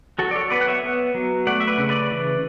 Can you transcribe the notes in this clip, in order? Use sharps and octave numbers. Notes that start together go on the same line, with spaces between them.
F#3 F#4 A4
D5
A4 C#5
B3 B4 D5
F#5
C#5 E5
B3
F#3
A3 D5 F#5
E5
B4 D5
C#3
B4 D5
E3